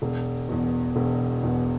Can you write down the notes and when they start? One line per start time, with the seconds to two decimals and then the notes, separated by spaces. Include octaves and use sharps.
0.02 E1
0.49 E2 B2
0.96 E1
1.43 E2 B2